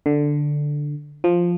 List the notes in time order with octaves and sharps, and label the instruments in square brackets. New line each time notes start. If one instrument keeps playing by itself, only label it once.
[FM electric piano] D3
F3